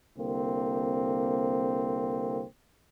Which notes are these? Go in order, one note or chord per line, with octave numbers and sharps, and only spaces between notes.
C2 D3 A#3 C4